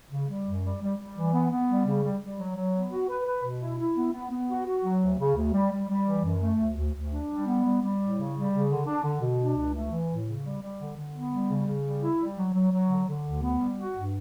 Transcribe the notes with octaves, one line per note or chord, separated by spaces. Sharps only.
C#3
G3
F#2
G3
G3
G3
E3
B3
B3
G3
C#3
G3
G3
F#3
F#3
B3
F#4
B4
B4
B2
E4
E4
B3
B3
B3
F#4
F#4
F#3
D2
C#3
D2
G3
G3
G3
E3
F#2
A3
D2
D2
D2
D4
G3
B3
G3
G3
A2
C#3
G3
C#3
D3
D4
D3
B2
D4
C#2
A3
E3
A2
C#3
G3
G3
D3
D3
B3
G3
C#3
C#3
G3
E4
G3
F#3
F#3
F#3
D3
D3
D2
B3
G3
F#4
G2